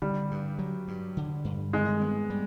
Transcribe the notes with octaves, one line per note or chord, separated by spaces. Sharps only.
D3 G3
G2
F#3
G2
D3
G2
D#3 G#3
B3
G3